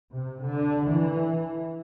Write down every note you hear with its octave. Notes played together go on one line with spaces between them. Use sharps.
C3
D3
E3